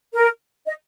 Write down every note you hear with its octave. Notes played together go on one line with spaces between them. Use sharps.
A#4
D#5